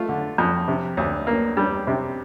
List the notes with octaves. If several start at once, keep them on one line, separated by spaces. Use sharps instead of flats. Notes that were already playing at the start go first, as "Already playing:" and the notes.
Already playing: A3 F4
D3
F2
C3
D2
A#3
G3
C3